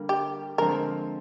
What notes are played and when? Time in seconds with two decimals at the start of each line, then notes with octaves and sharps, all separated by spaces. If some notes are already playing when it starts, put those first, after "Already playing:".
Already playing: D3 G3 A#3
0.09 G4
0.58 D3 F3 G#3 C4 A#4